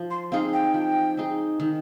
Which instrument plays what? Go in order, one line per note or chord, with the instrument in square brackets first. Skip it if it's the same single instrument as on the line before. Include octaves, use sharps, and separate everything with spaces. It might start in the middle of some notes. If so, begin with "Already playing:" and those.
Already playing: [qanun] F3
[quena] C6
[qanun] C4 D#4 G#4 [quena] F5
[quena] G5
[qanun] F3
C4 D#4 G#4
D#3